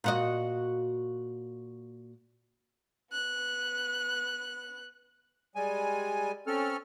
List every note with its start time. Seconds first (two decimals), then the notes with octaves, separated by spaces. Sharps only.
0.04 A#2 F#4 D#5
3.12 B3 F#6
5.56 G3 G#3 G#5
6.47 C4 C#4 A4 F6